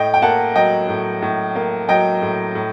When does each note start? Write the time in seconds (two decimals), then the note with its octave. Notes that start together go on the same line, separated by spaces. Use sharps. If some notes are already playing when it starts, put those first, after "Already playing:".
Already playing: A2 D#5 G5
0.14 G5
0.22 A#3 F#5 A5
0.56 F#3 D#5 G5
0.89 A2
1.22 A2
1.55 A#3
1.89 F#3 D#5 G5
2.22 A2
2.55 A2